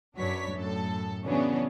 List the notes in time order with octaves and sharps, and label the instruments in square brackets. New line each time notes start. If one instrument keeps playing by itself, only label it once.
[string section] F#2 F#3 D4 B4 C#5 B6
F#2 A2 A4
C#3 E3 F#3 B3 C#4 D4